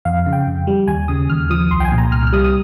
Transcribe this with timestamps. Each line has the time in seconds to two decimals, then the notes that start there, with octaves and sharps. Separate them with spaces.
0.05 F2 F5
0.26 C#3
0.33 G5
0.47 F2
0.67 G3
0.88 D#2 G#5
1.08 C#3 D#6
1.30 D#2 F6
1.50 F3 D#6
1.71 C2 C6
1.80 G5
1.85 G#5
1.92 A#2
1.98 A#5
2.12 C2 F6
2.27 F6
2.32 G3 D#6
2.44 D#6